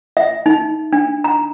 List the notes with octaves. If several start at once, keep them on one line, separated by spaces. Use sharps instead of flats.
E5
D#4
D4
A#5